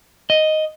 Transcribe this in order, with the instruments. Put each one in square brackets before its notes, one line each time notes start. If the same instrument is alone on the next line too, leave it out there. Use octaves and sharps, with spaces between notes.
[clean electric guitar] D#5